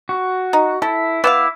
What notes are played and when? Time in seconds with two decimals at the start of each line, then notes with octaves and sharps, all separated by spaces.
0.09 F#4
0.53 D#4
0.82 E4 A4
1.24 B3 E4 C5 F5 D6 E6